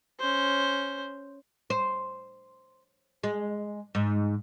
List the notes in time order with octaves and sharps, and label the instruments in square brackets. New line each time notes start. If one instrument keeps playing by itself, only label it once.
[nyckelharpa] C#4 C5
[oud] C5
G#3
G#2